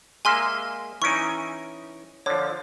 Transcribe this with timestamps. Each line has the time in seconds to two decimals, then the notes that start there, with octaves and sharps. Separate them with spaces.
0.25 G#3 A#3 E5 G#5 C6 F6
1.02 E3 C#4 D#4 C#6 D7
2.26 D3 F3 C#5